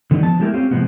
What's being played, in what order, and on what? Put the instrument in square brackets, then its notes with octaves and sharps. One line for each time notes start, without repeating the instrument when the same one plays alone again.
[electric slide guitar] D3 D#3 G3 B3 C#4 D#4
F3 B3 A5
F#3 G#3 A3 E4 G4 A#4
C4 C#4 F4 G4
A2 C3 F3 G#3 B3